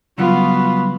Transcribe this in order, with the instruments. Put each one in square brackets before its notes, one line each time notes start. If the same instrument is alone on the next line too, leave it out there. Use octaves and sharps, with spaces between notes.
[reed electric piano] C#3 F#3 G3 [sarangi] B3 [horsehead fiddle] F4 F#4